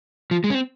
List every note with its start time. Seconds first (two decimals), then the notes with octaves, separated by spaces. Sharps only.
0.31 F3
0.44 G#3
0.50 C#4
0.55 C4